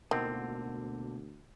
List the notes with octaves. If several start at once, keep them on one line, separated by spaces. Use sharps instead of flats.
D2 B2 D3 D#3 A#3 C4